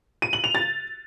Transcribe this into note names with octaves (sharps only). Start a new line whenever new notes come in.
D#7
F#7
F7
A6